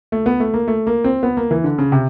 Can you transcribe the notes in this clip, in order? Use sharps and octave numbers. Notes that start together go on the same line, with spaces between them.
A3
B3
A3
A#3
A3
A#3
C4
B3
A#3
E3
D3
C#3
C3